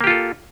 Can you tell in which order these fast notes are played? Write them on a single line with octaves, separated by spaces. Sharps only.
A#3 G4 F4 A4